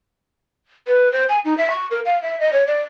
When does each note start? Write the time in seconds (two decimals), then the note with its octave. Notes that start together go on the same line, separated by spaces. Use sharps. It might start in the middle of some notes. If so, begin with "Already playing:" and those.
0.88 B4
1.12 C5
1.29 G#5
1.45 D#4
1.58 E5
1.70 C#6
1.91 A#4
2.05 F5
2.22 E5
2.40 D#5
2.53 C#5
2.67 D5